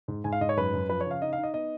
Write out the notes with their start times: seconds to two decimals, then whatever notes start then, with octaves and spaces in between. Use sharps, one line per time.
0.08 G#2
0.24 G#2 G#5
0.32 F5
0.41 G#2 D#5
0.49 C#5
0.57 F#2 B4
0.73 F#2
0.89 F3 B4
1.01 C#5
1.06 C#3 F5
1.22 D#4 D#5
1.33 F5
1.38 D#4
1.43 D#5
1.54 B3 D#5